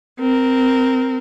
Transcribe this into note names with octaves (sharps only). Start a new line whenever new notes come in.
C4 A#4